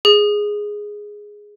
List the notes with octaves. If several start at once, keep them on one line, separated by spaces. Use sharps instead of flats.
G#4